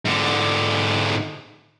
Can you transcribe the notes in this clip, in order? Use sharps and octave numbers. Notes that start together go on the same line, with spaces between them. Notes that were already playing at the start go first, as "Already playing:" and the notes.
G#2 D3